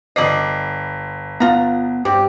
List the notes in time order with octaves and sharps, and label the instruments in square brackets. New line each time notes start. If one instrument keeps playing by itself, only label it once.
[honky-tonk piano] G1 C7 [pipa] G3 D5 D#5
[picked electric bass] B3 [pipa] F4 A#5
[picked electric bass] G2 [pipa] C4 [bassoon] G4